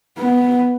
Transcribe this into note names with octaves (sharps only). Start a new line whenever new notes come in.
B3